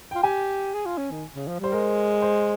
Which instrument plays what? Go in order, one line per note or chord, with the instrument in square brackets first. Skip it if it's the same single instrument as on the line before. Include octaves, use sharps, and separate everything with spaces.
[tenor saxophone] F4 [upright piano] G5
[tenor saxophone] G4 [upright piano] G#5
[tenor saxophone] G#4
F4
C#4
D#3
C#3
F3
[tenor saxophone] G3 [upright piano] C5
[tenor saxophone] G#3 [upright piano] A#4
[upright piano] C5